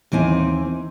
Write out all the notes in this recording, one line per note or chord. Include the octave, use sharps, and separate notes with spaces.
D#2 E3 C4 G#5